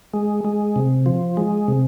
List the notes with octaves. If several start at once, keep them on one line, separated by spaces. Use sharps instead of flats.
G#3
G#3
C3
F3
G#3
C3